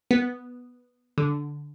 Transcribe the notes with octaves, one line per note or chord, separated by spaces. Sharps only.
B3
D3